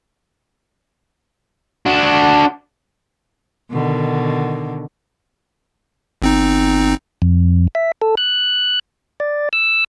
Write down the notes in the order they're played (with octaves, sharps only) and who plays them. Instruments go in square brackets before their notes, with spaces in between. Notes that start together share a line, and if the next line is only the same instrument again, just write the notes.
[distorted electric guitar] D4 F#4
[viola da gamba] B2 D3 D#3
[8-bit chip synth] G1 C4 D#4
[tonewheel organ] F2
E5
A4
F#6
D5
E6